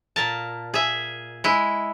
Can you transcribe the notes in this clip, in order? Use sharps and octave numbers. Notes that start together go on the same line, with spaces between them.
A#2 A#4 A5
G#4 E5
G#3 E4